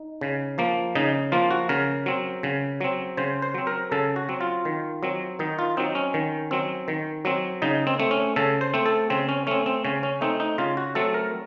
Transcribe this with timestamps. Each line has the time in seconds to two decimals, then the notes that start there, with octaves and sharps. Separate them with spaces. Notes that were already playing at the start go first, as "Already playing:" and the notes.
Already playing: D#4
0.21 C#3
0.58 F3 A#3
0.95 C#3 D#4
1.32 F3 A#3 F4
1.51 F#4
1.69 C#3 A#4
2.06 F#3 C4
2.43 C#3
2.81 F#3 C4
3.17 C#3 C5
3.42 C5
3.54 F#3 C4
3.67 A#4
3.91 C#3 A4
4.16 F#4
4.29 F#3 C4
4.41 F4
4.65 D#3
5.03 F#3 C4
5.39 D#3 D#4
5.59 F4
5.77 F#3 C4 D#4
5.95 C#4
6.14 D#3
6.51 F#3 C4
6.88 D#3
7.25 F#3 C4
7.62 C#3 D#4
7.87 C4
7.99 A3 C4
8.11 C#4
8.36 C#3 A4
8.61 C5
8.74 A3 C4
8.86 A4
9.10 C#3 C4
9.29 C#4
9.47 A3 C4 C#4
9.66 C4
9.84 C#3 C#4
10.03 C#4
10.21 A3 C4 D#4
10.40 D#4
10.58 C#3 F4
10.77 F#4
10.95 F#3 A3 C4 A4
11.14 A#4